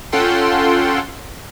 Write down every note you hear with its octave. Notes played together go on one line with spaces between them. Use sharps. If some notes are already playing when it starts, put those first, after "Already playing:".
C#4 F4 A4 F#5 G5 C6